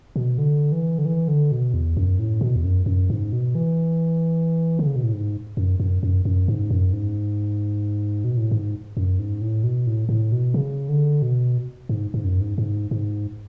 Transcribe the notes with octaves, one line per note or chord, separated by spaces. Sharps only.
B2
D3
E3
D3
E3
D3
B2
E2
F#2
A2
B2
E2
F#2
F#2
G#2
B2
E3
D3
C#3
B2
A2
G#2
F#2
F#2
F#2
F#2
G#2
F#2
G#2
B2
A2
G#2
F#2
G#2
A2
B2
A2
A2
B2
C#3
D3
B2
G#2
G#2
F#2
G#2
G#2
G#2